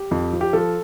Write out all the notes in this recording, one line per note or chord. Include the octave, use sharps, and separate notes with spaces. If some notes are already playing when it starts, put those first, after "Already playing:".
Already playing: G4
F2
F3
G4
F3 A4